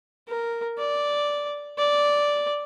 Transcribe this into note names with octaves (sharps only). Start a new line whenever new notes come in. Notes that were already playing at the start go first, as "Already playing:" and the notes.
A#4
D5
D5